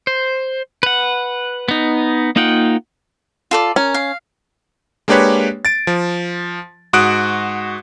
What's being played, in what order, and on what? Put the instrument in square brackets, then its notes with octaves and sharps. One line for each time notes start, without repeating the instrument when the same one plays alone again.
[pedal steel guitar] C5
B4 F#5
B3 D#4
A#3 D#4 F4 F#5 G5
[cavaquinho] F4 A4 D5
[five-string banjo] C#4 [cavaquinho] A#4
[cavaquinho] F5
[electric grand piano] G#3 A#3 D4 G4 B4 C#5
A6 D7
F3
G#2 F#4 D#6 F#6 D7